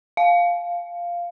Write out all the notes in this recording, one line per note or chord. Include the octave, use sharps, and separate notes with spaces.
F5